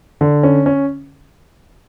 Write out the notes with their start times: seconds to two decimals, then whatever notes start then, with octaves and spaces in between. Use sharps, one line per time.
0.21 D3
0.43 C#4
0.66 C#4